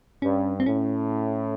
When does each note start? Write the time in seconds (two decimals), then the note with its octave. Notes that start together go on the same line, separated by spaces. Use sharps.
0.22 G2 C#4
0.60 C4
0.66 A2 C#4